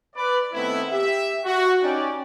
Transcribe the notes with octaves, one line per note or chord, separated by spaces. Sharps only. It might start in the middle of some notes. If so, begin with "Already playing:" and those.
B4 D5
D#3 A3 B3 C4 E4
G4 E5
F#4
C#4 D#4 G4 D5